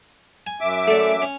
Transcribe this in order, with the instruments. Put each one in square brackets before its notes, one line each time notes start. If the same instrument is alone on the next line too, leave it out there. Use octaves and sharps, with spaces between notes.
[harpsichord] G#5
[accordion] F#2 E5 D6
[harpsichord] A3 D5
C#4